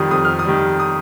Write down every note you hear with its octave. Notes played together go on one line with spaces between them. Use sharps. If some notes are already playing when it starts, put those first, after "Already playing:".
Already playing: F2 D#3 G3 D#6
F2 D#6
F6
D#6
D#3 G3
D#6